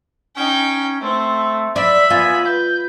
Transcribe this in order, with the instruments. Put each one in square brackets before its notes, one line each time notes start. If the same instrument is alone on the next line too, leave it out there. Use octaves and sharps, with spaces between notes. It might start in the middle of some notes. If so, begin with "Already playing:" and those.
[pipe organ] C#4 [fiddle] D#4 G5
[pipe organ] A3 [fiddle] C4
[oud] D5 [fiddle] E5 B5
[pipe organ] B3 G#5 [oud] F4
[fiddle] B4 [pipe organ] G6